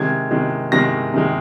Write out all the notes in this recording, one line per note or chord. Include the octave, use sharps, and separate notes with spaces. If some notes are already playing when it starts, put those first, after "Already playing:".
Already playing: C3 D#3 G#3 G#6
C3 D#3 G#3
C3 D#3 G#3 A#6
C3 D#3 G#3